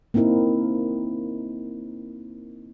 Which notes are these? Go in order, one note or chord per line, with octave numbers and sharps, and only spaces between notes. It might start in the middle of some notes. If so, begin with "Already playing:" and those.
A#3 C4 D#4 E4 A#4